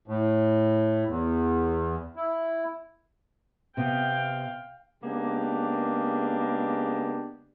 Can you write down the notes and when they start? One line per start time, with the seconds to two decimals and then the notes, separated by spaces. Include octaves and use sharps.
0.08 A2
1.07 E2
2.16 E4
3.77 C3 B3 F5 G5
5.02 C#3 G#3 A#3 B3 D4 G4